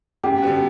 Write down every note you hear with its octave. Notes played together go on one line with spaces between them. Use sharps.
F#2 G4
D3 G3 B3 F#4